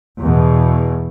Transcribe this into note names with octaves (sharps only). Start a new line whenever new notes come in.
E2 B2